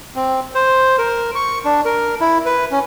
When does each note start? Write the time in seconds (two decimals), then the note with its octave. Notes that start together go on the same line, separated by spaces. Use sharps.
0.16 C4
0.55 C5
0.98 A#4
1.35 C#6
1.65 D4
1.85 A#4
2.21 E4
2.46 B4
2.72 C#4